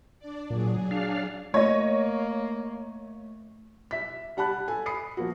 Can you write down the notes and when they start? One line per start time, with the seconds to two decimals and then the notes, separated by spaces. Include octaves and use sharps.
0.19 D4 D5
0.50 A#2 F#3 G#4
0.91 D4 F5
1.54 A3 A#3 C#5 D#5
3.91 E5 B6
4.37 G3 F#5 A5 B5 F#6
4.68 A4 G#5
4.86 B5 D#6 C7 C#7
5.17 F3 A#3 F#4